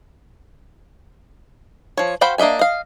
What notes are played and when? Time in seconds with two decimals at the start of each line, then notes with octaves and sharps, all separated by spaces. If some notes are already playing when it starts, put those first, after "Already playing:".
1.97 F3 C#5
2.21 F#4 C5 F5 G5 B5
2.38 A#3 D4 D#5 E5 G#5
2.59 D#5 F5